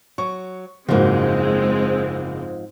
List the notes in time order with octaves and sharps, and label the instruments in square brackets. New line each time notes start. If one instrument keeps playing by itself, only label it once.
[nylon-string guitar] F#3 [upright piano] C#6
[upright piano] F#1 A#3 F#4 [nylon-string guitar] G#2 F3 [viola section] G#3 C4